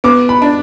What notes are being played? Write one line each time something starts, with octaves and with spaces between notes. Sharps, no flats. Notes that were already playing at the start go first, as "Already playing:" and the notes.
B3 D6
B5
D4